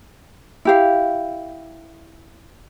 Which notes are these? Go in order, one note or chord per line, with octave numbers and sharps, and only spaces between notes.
E4 G4 F5